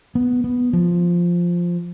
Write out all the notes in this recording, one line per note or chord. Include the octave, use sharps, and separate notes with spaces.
B3
B3
F3